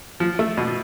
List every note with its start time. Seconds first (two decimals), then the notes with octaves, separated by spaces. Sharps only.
0.20 F3
0.39 A3
0.57 B2